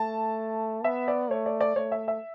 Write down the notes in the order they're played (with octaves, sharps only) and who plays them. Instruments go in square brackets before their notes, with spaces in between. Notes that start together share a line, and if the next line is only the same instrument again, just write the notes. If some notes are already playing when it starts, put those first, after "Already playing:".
Already playing: [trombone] A3 [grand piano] A5
[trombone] B3 [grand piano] E5
[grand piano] D5
[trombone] A3 [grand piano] C#5
[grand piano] D5
D5
[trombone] A3 [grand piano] C#5
[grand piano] E5
E5